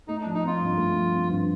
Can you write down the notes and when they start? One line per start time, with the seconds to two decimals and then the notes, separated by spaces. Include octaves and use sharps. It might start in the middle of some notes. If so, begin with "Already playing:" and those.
0.08 A3 D#4
0.22 D4
0.26 F3
0.35 D#4
0.43 C4 F4
0.60 G2
0.77 A3
0.94 F3
1.12 C4
1.29 G2